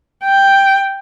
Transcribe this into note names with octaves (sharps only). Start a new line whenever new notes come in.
G5